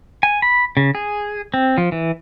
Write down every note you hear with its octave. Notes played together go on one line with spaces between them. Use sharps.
G#5
B5
C#3
G#4
C4
F3
E3